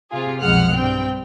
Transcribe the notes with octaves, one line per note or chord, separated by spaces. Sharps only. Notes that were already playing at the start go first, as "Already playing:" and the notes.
C3 F4 G#4
B1 F2 G#3 F#5 F6 F#6
G2 C4 G5